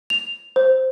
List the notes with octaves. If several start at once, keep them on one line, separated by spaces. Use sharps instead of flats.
F7
C5